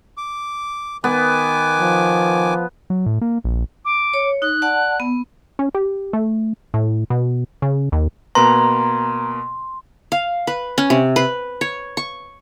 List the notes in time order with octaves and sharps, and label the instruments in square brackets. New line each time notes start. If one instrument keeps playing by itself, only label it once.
[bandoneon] D6
[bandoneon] D#3 G#5 D6 [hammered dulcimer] B3
[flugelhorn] F3
[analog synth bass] F#3
A2
A#3
A#1
[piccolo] D6
[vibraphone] C#5
[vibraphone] D#4 [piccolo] F#6
[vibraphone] D5 F#5 A5
B3
[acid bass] C#4
G4
A3
A2
B2
C#3
D#2
[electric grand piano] B2 A#3 B4 [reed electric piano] A#5 [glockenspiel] C6
[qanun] F5
B4
C#4
C3
B4
C#5
C#6